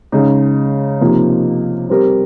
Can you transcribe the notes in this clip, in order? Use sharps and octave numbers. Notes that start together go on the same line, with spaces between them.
C#3 G#3 D#4
C3 F3 A#3 D#4
G3 C4 G4 A#4